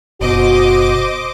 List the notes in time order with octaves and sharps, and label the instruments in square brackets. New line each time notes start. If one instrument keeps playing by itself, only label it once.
[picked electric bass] F#1 B2 [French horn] F#4 [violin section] C5 D#5 D6